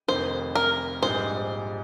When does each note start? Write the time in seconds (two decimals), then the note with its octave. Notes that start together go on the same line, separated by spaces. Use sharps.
0.08 F1 F2 D#3 C5
0.55 A#4
1.03 A#1 G#2 G3 C5